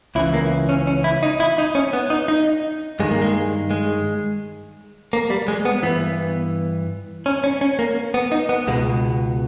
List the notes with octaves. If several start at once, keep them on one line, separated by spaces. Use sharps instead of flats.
C#2 C#3 E3 E4
A#3
C#4
C#4
E4
D#4
E4
D#4
C#4
B3
D#4
D#4
G2 D#3 G#3
A#3
G#3
G#3
A#3
G3
G#3
B3
G2 E3 B3
C#4
C#4
C#4
A#3
B3
D#4
B3
C#2 B2 G#3